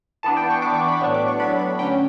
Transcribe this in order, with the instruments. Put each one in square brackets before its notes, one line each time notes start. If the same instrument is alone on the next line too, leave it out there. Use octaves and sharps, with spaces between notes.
[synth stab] E3 B3 D4 A5
G5
C#6
E3 B3 D4 D6
C#6
B5
A2 F#3 B3 D4 C#6
D6
C#6
A2 F#3 B3 D4 B5
B5
D3 F#3 C#4 G5